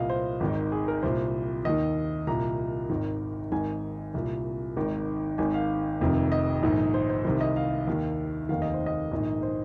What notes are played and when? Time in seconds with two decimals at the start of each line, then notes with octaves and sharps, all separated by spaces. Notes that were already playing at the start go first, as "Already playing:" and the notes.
Already playing: C2 A#2 D#5 F5
0.10 C5
0.40 G#1 G#2 D#3
0.72 G#4
0.88 A#4
1.03 C2 A#2 C5
1.65 D#2 D#3 D#5
2.27 C2 A#2 A#5
2.90 G#1 G#2 D#3
3.51 G#1 G#2 D#3 G#5
4.14 C2 A#2
4.77 G#1 G#2 D#3
5.38 G#1 G#2 D#3 G#5
5.54 F5
6.01 F1 F2 C3 D#3
6.32 D#5
6.63 A#1 G#2 D#3
6.94 C5
7.10 C5
7.25 C2 C3 D#3 C5
7.41 D#5
7.56 F5
7.87 D#2 D#3
8.49 F1 D#2 D#3 F5
8.62 D#5
8.74 C5
8.86 D#5
9.11 A#1 G#2 D#3
9.43 C5